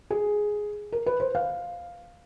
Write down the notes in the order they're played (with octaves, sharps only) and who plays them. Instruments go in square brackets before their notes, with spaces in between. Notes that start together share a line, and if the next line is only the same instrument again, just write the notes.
[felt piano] G#4
A#4
B4
C5
F5